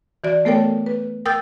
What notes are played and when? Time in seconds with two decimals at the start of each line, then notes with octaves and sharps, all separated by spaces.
0.24 E3 F#4 D5
0.45 A3 B3 A4 A#4 C#5 G5
0.86 B4
1.25 A#4 G5 D#6 E6 G6 A6